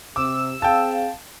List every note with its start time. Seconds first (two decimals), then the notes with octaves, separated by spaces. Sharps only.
0.16 C3 D6 E6
0.62 C4 G#4 F5 G5 A5